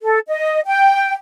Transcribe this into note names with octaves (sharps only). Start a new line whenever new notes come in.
A4
D#5
G5